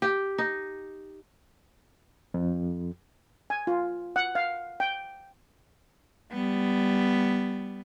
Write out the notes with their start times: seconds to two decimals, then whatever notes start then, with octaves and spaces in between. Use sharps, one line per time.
0.02 G4
0.38 D#4
2.34 F2
3.50 G#5
3.67 F4
4.16 F#5
4.35 F5
4.80 G5
6.31 G3 B3